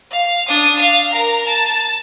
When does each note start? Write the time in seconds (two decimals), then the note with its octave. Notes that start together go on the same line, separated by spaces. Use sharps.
0.11 F5
0.48 D4 D#6
0.79 F5
1.13 A#4 A#5
1.47 A5